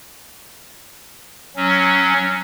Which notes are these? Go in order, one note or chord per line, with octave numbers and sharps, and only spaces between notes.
F#3 C#4